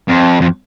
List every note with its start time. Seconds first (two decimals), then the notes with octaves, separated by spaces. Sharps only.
0.08 F2
0.41 F2